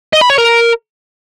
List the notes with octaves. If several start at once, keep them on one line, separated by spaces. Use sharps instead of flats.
D#5
B5
C#5
A#4